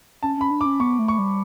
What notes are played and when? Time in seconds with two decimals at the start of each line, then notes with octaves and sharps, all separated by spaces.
0.23 C#4 A5
0.37 C#4 B5
0.50 D4
0.61 D6
0.65 C#4
0.80 B3 C#6
0.99 A3
1.08 C#6
1.19 G3